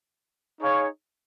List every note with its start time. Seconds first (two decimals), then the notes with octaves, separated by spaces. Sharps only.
0.59 D#4 G#4 C#5 F5